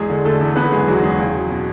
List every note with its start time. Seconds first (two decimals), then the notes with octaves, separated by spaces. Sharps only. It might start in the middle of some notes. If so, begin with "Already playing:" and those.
Already playing: E2 G#3 G#4
0.10 D3
0.25 D3 A3 A4
0.41 E2
0.56 E2 B3 B4
0.72 F#1 G#3 G#4
0.87 E2 F#3 F#4
1.03 E2 G#3 G#4
1.18 C#2
1.34 F#3
1.50 B2